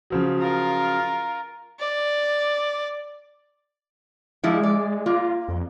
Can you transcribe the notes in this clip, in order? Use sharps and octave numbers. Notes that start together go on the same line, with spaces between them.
C#3 F3 F#3
F4 A#4
D5
F3 G3 G#3 E4
D5
A#3 F4
F2